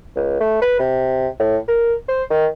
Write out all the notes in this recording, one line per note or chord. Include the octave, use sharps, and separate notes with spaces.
C#2
A3
B4
C3
A2
A#4
C5
D#3